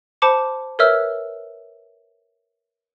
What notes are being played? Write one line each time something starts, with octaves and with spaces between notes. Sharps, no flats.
C5 A5 B5 D6 C#7
A#4 B4 C#5 E5 E6 F6